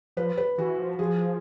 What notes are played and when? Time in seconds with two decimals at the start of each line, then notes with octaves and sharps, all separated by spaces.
0.17 F3 B4
0.38 B4
0.58 E3 F#4
0.78 F3
0.98 F3 G#4